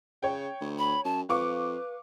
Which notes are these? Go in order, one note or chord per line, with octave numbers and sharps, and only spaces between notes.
C#3 C#5 G5
D2
B5
F#2 A5
F2 B4 F5 C#6 D6